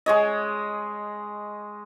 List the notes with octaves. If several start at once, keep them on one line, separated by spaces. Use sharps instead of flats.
G#3 C#5 D#5